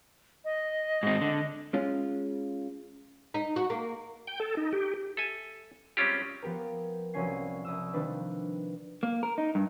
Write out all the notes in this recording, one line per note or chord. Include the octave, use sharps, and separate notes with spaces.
D#5
G#2 C4
D3
G#3 C#4 F4
D#4
F#4
A#3
G5
A4
D#4
G4
A4 E5 G#5
G3 G#3 C4 C#4 F4 G4
F3 B3 G4 A#4
C2 F3 F#3 C#4 G#5 C7
C2 D#6 E6
C3 D#3 F3 G3 D4 B4
A#3
A#4
D#4
G2